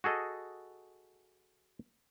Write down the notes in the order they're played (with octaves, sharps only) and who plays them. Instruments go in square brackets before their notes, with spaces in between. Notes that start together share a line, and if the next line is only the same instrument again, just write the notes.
[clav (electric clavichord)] F#4 G#4 A4 D#5